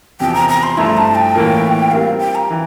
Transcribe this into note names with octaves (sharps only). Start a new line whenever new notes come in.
E2 C3 F3 G5
A#5
A#5
C6
G2 F3 A3 E4 A#5
A5
G5
A2 E3 A#3 F4 A#4
G3 C4 F4 A#4 F5
G5
A#5
E3